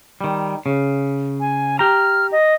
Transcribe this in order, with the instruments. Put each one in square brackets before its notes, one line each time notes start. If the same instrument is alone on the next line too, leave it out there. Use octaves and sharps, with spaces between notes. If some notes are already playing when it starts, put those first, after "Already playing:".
[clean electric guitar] D#3 G3
C#3
[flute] G#5
[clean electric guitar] G4 A#5 [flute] F6
[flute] D#5